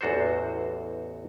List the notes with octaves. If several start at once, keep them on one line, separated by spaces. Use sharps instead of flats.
A1 E2 F#4 A4 C5